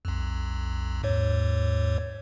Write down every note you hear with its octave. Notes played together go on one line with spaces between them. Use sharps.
B1 F2
D#2 G#2 C#5